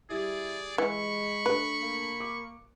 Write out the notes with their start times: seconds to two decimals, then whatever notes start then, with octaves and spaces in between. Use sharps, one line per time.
0.10 G3 E4 G4 G#4 D5
0.78 E3 G#3 B5 C#6
1.46 A3 D4 A4 B4
1.82 A#3
2.20 D6